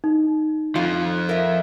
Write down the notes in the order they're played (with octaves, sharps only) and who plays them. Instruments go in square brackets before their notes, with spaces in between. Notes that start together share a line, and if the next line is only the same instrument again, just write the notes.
[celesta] D#4
[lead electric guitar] F2 F3 [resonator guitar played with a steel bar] F4
[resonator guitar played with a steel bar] A#4 E5